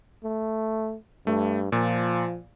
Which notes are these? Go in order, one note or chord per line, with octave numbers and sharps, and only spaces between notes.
A3
G2 A3
A#2 F3